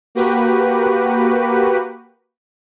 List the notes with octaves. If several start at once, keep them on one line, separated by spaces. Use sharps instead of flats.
A#3 F#4 G4 B4